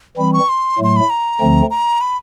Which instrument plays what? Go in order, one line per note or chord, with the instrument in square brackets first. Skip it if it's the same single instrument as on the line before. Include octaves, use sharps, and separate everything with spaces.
[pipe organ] E3 G3 C4 [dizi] B5
[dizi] C#6
C6
[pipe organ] A2 F#3 A3 [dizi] C6
[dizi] B5
A#5
[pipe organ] D2 D3 F3 A3 C4
[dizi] A#5
B5